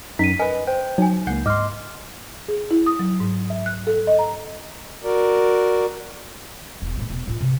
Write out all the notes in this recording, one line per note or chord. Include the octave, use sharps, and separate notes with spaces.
F#2 D#4 B6 D#7
A#4 B4 D#5 G#5
C5 G5
F#3 D#4 G#5
C#2 A#3 F#5 G6 C7
G#2 D#5 C6 D6 F6
G#4
E4
D#6
F#3
G#2
E5
F#6
A4
D#5
A#5
F#4 A#4 D5
E1 E4
A2 A3
E1
A2 F4
C3